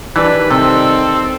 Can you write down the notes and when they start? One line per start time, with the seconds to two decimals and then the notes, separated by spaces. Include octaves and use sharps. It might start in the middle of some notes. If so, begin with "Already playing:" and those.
0.16 D#3 E3 G3 D4 B4
0.51 C3 C4 A4